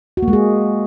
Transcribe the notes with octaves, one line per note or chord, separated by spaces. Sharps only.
F#4
A#3
G#3
G#4